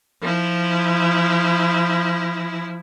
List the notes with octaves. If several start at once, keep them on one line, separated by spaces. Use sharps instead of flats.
F3 E4